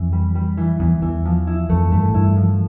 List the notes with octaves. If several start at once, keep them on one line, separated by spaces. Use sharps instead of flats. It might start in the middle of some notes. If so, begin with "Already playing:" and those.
Already playing: F2 E3
G3
G3
E3
E2 E3
E2 E3
F3
E4
F2 A3
G2 A3
A2
G2 E4
F3